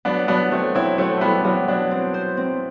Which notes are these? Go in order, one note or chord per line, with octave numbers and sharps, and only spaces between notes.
F#3 B3 D4
F#3 B3 D4
F#3 A3 C4
F#3 C4 E4
F#3 A3 C4
A3
G3 B3 E4
C4
F#3 G3 B3
F#3 B3 D4
C4
C5
C4